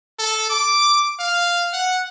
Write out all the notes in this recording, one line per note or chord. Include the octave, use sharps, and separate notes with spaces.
A4
D6
F5
F#5